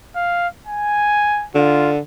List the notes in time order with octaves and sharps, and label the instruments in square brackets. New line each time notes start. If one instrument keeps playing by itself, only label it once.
[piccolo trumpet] F5
G#5
[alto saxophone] D3 [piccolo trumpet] F4